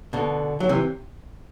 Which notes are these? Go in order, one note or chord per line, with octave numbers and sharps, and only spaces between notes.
B2 D3
F#3
C3 E3